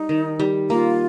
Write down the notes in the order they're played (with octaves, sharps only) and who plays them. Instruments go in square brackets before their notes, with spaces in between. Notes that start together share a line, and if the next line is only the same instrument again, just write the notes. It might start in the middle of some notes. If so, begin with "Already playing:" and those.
Already playing: [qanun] G3 [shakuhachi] D#4
[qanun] D#3
G3
[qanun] A#3 [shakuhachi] F4